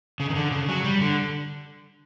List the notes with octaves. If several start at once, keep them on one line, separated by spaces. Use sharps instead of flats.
C#3
D#3
D3
C#3
F#3
G3
D3